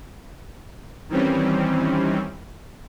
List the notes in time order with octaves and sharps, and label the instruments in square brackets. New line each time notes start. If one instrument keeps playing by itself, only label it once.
[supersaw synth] D#3 E3 G3 C4 C#4